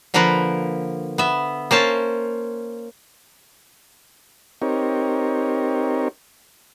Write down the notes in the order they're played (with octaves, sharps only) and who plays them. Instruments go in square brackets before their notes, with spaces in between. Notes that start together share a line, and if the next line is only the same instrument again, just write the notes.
[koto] D3 F3 A#3 A#4 B4
B3 E5
A#3 C#4 C5 A5
[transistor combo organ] C4 D#4 G4 A#4 C#5